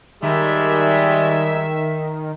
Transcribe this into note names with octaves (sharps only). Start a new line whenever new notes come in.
D#3 G3 G#3 E5